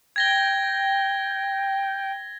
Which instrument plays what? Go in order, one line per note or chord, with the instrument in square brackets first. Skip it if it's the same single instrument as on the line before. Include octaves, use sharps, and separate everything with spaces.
[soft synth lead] G5 [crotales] G#6 A#6 G7